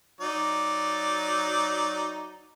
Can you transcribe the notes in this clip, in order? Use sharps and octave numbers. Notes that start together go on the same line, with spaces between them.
F#3 D#4 D5